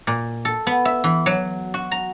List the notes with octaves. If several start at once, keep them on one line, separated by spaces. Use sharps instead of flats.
A#2
A4
B3
E5
E3
F#3
F#4
A#5